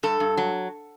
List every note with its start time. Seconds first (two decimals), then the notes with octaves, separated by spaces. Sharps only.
0.03 G2 A4
0.20 G2
0.37 F#3